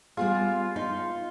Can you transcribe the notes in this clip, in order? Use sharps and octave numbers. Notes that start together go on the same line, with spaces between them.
G3 B3 F4 G#4
D#4 C6